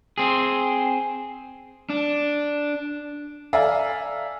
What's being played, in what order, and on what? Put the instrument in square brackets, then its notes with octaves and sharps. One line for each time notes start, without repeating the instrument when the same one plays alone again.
[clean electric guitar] C4 G#4
[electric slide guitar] D4
[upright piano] A4 D5 E5 F5 G#5 A#5